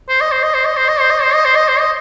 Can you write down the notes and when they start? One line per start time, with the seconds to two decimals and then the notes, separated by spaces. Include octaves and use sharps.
0.09 C5
0.21 D#5
0.32 C5
0.43 D#5
0.54 C5
0.66 D#5
0.77 C5
0.89 D#5
1.00 C5
1.11 D#5
1.23 C5
1.34 D#5
1.45 C5
1.56 D#5
1.68 C5
1.80 D#5